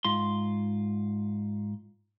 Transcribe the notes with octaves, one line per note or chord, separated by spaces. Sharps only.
G#2 F4 C6